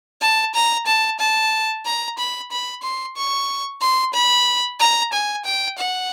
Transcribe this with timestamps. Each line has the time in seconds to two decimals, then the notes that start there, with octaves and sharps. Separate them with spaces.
0.21 A5
0.54 A#5
0.87 A5
1.19 A5
1.85 A#5
2.18 B5
2.51 B5
2.83 C6
3.17 C#6
3.81 C6
4.13 B5
4.80 A#5
5.13 G#5
5.45 G5
5.78 F#5